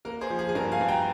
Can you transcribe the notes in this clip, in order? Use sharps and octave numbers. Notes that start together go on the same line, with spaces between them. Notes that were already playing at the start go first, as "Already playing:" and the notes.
A#3 A#4
G#4 C5
F3
G#4
G#4
G2 A#4
F5 G#5
G2
G5 A#5